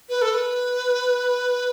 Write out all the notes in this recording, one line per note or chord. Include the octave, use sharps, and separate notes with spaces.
B4
A4
B4